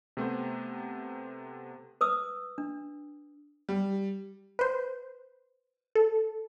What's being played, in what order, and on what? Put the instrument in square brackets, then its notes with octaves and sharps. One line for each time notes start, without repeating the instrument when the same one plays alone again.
[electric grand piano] C3 A3 B3 C5
[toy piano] B4 D#6 E6
D4
[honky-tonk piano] G3
[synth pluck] B4 C5
A4